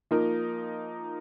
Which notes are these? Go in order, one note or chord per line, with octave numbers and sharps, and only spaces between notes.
F3 A#3 D#4 A#4